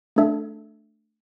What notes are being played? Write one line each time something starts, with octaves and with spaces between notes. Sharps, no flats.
A3 D4 A4 E5